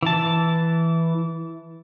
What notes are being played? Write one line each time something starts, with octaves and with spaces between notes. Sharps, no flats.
E3 A5